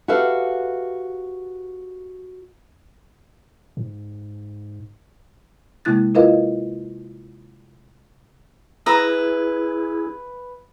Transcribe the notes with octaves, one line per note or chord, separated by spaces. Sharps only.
F#4 G4 A4 B4 E5 F5
G#2
C3 G#3 A#3 E4 F#6 A6
E4 F4 A#4 B4 D#5 F5
E4 G#4 B4 E5 A#5